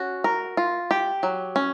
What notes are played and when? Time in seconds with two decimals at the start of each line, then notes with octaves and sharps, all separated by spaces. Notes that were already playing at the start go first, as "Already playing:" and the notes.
Already playing: C#4 F#4
0.24 A#4
0.57 F4
0.91 G4
1.23 F#3
1.56 C#4